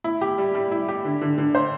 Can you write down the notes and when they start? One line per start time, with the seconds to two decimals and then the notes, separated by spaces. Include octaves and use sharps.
0.04 E4
0.21 G4
0.38 G3
0.54 G3
0.71 E4
0.89 G4
1.05 D3
1.21 D3
1.38 D3
1.55 C5